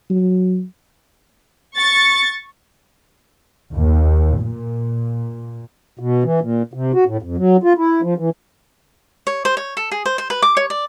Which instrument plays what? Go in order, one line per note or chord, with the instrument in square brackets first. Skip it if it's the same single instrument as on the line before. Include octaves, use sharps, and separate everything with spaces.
[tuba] F#3
[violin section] C#6 A6
[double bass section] D#2
A#2
[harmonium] B2
E3
A#2
C3
F#4
A2
F2
F#3
F4
E4
F3
E3
[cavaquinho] C#5
C5
C#5
A4
G#4
C5
C5
B4
D6
C#5
D5